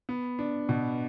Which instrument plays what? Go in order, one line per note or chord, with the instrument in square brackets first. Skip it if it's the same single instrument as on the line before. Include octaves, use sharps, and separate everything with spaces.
[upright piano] B3
D4
B2